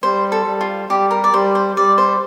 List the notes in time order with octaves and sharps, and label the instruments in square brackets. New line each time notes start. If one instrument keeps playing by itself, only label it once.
[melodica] G3 [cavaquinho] C5
[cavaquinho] A4
[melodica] G3
[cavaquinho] F4
[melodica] G3 [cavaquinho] G4
[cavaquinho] A#4
D5
[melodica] G3 [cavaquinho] C5
[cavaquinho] C5
[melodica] G3 [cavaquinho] D5
[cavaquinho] C5